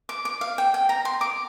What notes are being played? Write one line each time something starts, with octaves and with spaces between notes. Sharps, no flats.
D6
D6
F5
G5
G5
A#5
C6
D6